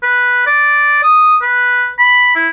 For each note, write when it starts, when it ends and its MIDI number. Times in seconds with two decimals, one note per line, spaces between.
0.03 0.46 71
0.47 1.00 74
1.03 1.37 87
1.42 1.89 71
1.99 2.31 83
2.36 2.49 64